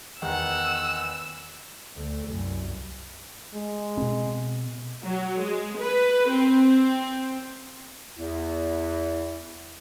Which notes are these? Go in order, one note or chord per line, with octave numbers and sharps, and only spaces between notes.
E2 D#3 F#5 E6
D2 A3
C2 F#2
G#3
B2 C4
F#3
G#3
B4
C4
E2 E4